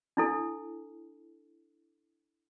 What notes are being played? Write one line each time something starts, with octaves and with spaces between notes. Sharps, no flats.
D4 E4 A4